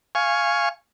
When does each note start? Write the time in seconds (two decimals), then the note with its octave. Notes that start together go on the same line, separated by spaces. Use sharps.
0.15 F5 G#5 C#6